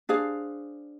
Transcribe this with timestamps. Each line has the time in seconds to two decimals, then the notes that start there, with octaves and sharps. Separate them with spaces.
0.09 D4 G#4 C5 F5